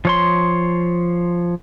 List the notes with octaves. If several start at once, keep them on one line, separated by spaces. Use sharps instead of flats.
F3 C#5 C6